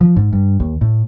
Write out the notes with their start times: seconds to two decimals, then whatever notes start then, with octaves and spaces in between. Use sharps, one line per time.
0.01 F3
0.16 G#2
0.33 G2
0.60 D#2
0.81 A2